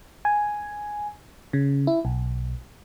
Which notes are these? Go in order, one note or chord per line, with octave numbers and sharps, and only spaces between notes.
G#5
C#3
E4
B1